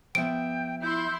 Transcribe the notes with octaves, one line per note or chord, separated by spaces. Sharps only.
F3 B3 E5 G5 D7
E4 C6 G6